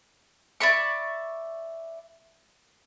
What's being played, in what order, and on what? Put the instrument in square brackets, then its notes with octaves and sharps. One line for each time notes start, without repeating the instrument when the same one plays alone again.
[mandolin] D5 E5 B5 C#6